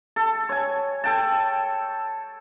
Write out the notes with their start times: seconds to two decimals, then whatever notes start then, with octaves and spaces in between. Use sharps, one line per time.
0.16 A4
0.49 C#5 G#5
1.04 A4 G5 A5